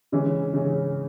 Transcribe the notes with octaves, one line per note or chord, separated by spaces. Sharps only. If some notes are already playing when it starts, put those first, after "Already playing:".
C#3 E3 G#3 C#4
C#3 E3 G#3 C#4